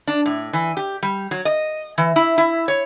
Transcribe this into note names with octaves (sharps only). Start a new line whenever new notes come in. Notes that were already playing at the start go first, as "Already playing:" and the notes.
D4
A2
E3
G4
G3
F#3
D#5
E3
E4
E4
C#5